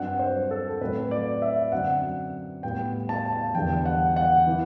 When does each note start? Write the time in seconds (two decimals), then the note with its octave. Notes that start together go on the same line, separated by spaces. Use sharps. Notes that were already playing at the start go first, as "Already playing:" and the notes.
Already playing: G2 F#3 C4 F#5
0.19 C5
0.51 A4
0.69 A4
0.81 A2 F#3 C4 B4
1.11 D5
1.42 E5
1.72 F#2 D3 F#3 C4 F#5
2.63 A2 G3 B3 G5
3.09 A5
3.32 A5
3.55 E2 D3 G3 B3 G5
3.86 F#5
4.16 F#5
4.47 E3 B3